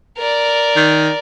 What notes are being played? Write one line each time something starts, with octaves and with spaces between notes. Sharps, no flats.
A#4 D5
D#3